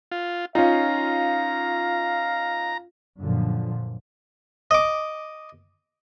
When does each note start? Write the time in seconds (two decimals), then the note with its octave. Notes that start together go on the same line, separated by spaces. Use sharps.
0.12 F4
0.55 C#4 D#4 F4 F5 A#5
3.21 F#2 A#2 D3 F3
4.71 D#5 D6